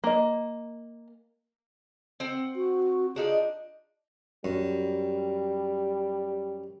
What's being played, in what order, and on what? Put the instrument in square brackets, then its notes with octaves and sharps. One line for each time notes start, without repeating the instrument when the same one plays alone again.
[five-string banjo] A#3 D#5
[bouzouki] C4 F#5 G5
[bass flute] F#4
[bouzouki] D4 D#4 F4 [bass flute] G#4
[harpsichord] F#2 [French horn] G3